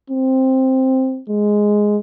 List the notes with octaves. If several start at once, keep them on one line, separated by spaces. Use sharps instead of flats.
C4
G#3